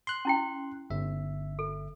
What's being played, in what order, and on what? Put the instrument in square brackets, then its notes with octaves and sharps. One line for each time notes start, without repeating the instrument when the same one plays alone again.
[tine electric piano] C6 F#6
[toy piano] C#4 E4 G5
[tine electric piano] G1 E5
[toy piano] A4